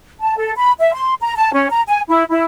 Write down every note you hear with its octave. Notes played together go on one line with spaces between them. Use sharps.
A5
A4
B5
E5
C6
A#5
A5
C#4
A#5
G#5
E4
E4